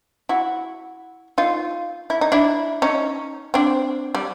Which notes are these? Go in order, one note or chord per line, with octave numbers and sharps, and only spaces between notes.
E4 F#4
D#4 F4
E4
D#4
D4 E4
C#4 D#4
C4 D4
G3